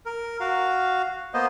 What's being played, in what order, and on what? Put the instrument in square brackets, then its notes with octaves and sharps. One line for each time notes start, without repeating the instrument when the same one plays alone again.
[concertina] A#4
F#4 F5
A#3 B3 C5 D#5